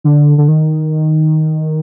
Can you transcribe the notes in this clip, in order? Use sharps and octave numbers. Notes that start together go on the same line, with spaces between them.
D3
D3
D#3